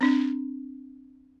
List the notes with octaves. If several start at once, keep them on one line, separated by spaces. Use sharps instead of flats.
C4 D4